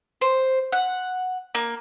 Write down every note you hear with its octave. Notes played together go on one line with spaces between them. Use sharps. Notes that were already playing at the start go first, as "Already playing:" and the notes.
C5
F#5
A#3